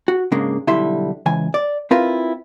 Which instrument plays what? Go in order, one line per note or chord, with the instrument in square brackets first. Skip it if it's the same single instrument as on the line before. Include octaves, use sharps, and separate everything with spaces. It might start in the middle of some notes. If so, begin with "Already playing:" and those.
[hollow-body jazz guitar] F#4
G#2 C#3 G#3 A#3 D4
B1 D3 G3 E4 E5 C6
C#2 E3 G#5
D5
C4 E4 F4 A#4 B4